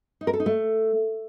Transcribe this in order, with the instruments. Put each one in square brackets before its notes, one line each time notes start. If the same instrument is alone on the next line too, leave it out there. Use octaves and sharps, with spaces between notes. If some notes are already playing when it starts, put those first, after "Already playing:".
[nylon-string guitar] D#4
A#4
A4
D#4
A3